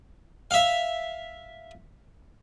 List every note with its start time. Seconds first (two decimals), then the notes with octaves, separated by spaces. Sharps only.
0.51 E5 F5